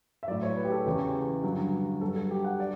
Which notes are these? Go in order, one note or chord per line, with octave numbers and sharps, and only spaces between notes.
E5
A2 F#3 D5
C#5
B4
G4
A4
E2 C#3 E3 G4
G2 D3 F#3
G2 F#3 A4
A4
G4
F#5
D5